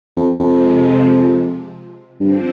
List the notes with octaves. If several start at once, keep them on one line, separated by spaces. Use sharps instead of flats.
F2
F2 C3 F3 G#3
G2 D3 F3 C4